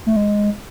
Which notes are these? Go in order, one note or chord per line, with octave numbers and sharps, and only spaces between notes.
A3
G#3